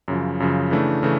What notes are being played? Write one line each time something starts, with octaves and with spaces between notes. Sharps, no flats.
F#2 C#3 F3
F#2 C#3 F3
C#3 E3 A3 D4
C#3 E3 A3